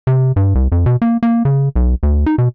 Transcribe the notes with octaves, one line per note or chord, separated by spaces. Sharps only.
C3
G2
C2
F2
B2
A#3
A#3
C#3
B1
D2
D#4
B2